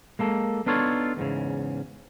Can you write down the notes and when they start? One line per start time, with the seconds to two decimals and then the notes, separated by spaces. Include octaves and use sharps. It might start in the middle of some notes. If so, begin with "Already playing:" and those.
0.19 G#3 A#3 A4
0.66 B3 D4 D#4 F4 A4 C#5
1.17 E2 G#2 C#3